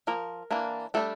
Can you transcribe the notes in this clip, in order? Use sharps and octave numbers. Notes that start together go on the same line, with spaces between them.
F3 A#3 A#4
E3 A#3 D4
G3 A3 A#3 D4 A4